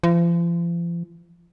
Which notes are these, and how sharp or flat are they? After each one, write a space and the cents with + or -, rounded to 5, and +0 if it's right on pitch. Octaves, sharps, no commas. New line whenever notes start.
F3 -40